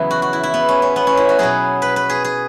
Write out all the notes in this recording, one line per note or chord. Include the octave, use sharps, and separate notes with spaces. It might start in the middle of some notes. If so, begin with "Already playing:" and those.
Already playing: E2 C#3 F#3 B3 E4
F#4
F#4
E4
E4
B3
C#4
C#4
B3
C#4
E4
F#4
B2 F#3 B3 G#4
B4
B4
G#4
G#4